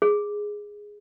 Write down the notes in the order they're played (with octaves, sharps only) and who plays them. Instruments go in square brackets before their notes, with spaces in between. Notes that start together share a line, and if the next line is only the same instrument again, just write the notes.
[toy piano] G#4